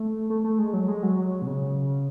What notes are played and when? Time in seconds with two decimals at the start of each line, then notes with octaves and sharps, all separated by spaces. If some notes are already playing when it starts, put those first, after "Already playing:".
Already playing: A3
0.30 A3
0.44 A3
0.59 G#3
0.73 F#3
0.88 G#3
1.03 F#3
1.17 F#3
1.42 B2
1.47 C#3